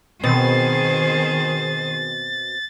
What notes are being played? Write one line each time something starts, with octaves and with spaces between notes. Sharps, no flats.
B2 D#3 C4 G#4 C5 A6